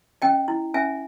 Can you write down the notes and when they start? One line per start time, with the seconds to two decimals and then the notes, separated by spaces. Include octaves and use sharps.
0.22 C#4 D#5 G5
0.48 E4
0.74 C#4 E5 G#5